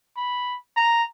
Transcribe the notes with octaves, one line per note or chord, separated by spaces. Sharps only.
B5
A#5